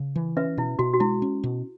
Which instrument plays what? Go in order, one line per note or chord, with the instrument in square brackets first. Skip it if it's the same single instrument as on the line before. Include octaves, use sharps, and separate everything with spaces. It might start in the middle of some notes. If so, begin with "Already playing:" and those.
Already playing: [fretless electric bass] C#3
E3
[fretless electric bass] C#4 [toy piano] B4 E5
[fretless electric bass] B2 [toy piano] E4
[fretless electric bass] B2 [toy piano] F#4
[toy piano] F#4
[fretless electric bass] G#3 [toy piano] E4
[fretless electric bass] C#4
B2